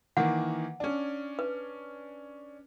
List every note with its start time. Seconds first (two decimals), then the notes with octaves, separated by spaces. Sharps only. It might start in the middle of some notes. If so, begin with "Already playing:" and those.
0.17 D#3 E3 A#3 F#5
0.80 C#4 D4
1.39 B4